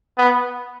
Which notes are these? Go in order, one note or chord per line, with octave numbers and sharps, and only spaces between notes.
B3